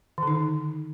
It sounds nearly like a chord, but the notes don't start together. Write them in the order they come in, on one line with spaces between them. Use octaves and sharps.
D#3 D3 D#4